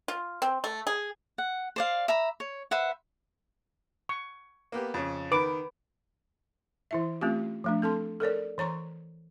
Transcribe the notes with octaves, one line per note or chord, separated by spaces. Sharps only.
F4
C4
A3
G#4
F#5
C5 D5 F5
E5 A#5 B5
C#5
B4 C5 E5 F#5
C#6
A#3 B3 G4
F2 C#3
D#3 B4 D6
E3 E4 E5
A3 C4 C#4 F4 G4
F3 A3 D4
C4 A4 A5 C6
A4 A#4 C#5 D5
E3 C#5 A#5 C#6